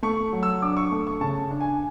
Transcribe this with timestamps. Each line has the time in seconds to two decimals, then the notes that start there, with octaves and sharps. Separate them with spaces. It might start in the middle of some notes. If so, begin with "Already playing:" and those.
0.03 A3 C#6
0.33 F#3
0.43 E6
0.62 D4 D6
0.77 C#6
0.91 A3
1.07 C#6
1.21 C#3 A5
1.51 D4
1.61 G#5